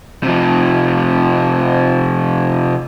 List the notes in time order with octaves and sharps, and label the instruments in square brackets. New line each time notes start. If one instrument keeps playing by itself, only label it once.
[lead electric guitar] C3 F3